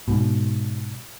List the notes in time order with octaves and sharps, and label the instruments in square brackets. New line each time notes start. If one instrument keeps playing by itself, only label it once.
[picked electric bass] G#2 B2